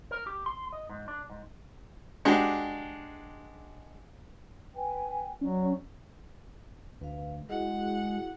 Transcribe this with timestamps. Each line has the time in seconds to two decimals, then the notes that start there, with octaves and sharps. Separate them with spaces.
0.11 A#4
0.27 G4
0.46 C6
0.72 D#5
0.90 G#2
1.08 D4
1.30 G#2
2.25 G#3 D4 F#4 G4
4.75 B4 G5 G#5
5.41 F#3 C#4 D5
7.01 D2 B4 F5
7.49 G#3 E4 F#4 G#4 F#5